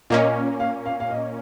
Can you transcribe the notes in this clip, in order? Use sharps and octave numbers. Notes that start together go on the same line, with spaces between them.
A#2 A#3 C#4 D#5
F5
F5
F5
D#5